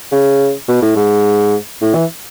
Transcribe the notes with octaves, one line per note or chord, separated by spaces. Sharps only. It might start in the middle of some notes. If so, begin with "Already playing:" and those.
C#3
B2
A2
G#2
A2
E3